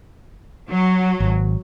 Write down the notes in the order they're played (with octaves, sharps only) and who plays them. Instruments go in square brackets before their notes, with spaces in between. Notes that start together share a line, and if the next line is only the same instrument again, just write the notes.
[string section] F#3
[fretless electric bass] G#1